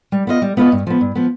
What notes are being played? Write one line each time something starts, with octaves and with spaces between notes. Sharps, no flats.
G3
B3 F4 B4 D#5
G3
B3 F4 B4 D#5
G2
F3 B3
G2
F3 B3